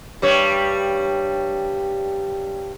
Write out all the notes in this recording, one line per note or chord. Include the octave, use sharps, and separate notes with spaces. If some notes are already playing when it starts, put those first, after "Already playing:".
G2 G3 C#5